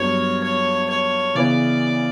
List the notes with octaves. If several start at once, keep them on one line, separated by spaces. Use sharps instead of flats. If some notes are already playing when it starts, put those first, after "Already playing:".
Already playing: G2 F#3 B3 C#5
C#5
C#5
C#3 E3 B3 D5